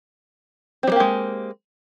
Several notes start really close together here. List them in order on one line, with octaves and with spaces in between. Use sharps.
C4 G3 A#3 G4 G#3